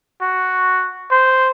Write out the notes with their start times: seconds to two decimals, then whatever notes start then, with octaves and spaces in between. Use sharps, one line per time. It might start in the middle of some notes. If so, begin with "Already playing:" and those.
0.21 F#4
1.11 C5